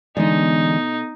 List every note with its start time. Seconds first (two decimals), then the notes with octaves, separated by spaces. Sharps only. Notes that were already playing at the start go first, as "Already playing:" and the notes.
0.17 B2 D3 E3 G#3 A3 D#4 D5